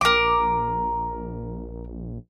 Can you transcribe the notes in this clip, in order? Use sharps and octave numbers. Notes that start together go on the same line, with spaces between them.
A#1 A#4 D6